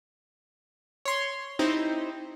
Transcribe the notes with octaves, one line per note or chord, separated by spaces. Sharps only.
C#5 C6
C4 D#4 E4 G4 C5